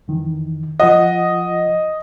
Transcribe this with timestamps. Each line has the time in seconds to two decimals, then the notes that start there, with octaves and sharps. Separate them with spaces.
0.08 F2 D#3 E3
0.80 F3 F4 D#5 F#5